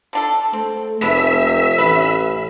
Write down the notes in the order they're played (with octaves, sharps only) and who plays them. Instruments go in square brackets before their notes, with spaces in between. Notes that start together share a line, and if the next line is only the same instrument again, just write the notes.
[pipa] D3 D4 A4
[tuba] A3 [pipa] C4
[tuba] F1 [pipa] G#3 B3 D4 [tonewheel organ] E5
[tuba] A1 [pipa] B4